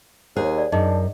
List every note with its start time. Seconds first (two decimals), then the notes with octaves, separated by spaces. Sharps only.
0.36 D#2 G#4 C5 C#5
0.58 D5
0.72 F#2 D4 D#4 G#4 D#5